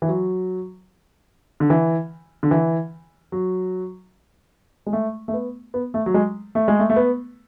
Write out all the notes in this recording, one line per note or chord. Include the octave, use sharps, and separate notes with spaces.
E3
F#3
D3
E3
D3
E3
F#3
G#3
A3
A3
B3
B3
A3
F#3
G#3
A3
G#3
A3
A3
B3